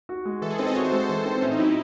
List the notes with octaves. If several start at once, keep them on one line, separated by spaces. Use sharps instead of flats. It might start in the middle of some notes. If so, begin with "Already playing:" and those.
F#4
G#3
E3 A4
G#4
C4 A4
D#5
F#4 C#5
C5
G#3 A4
C5
E3 A4
C4
A2 C#4
D#4
F#3 E4